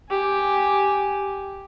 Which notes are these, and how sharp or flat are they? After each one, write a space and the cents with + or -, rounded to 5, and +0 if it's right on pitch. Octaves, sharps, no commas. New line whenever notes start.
G4 +0 G#5 +0